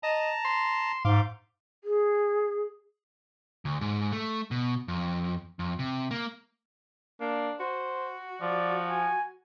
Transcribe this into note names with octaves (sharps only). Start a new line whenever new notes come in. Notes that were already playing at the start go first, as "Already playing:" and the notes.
D#5 A5 A#5
C6
G#2 F5 C6 D6
G#4
D2
G#2
A3
B2
F2
F2
C3
A#3
A#3 D4
F#4 C5
F3 D5
G#5